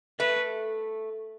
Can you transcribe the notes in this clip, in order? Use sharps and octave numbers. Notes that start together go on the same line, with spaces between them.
A3 B4